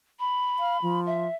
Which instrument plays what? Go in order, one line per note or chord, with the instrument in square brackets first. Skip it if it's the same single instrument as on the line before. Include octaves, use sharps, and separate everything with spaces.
[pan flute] B5
[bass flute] F5
F3
[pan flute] E5